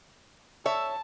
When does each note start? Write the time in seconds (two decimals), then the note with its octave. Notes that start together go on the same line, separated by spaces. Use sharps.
0.66 C#5 E5 A5